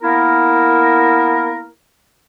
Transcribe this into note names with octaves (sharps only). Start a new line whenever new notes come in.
A#3 B3 E4 A#4